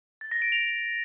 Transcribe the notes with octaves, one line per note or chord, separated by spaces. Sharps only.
A6
A#6
D7
F7